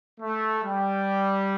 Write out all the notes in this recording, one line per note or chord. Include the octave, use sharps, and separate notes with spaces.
A3
G3